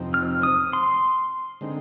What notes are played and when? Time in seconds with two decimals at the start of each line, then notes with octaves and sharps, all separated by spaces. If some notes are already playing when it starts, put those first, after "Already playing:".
Already playing: F2 C3 F3 C4 D#4
0.14 F6
0.43 D#6
0.73 C6
1.61 D3 G#3 C4 D#4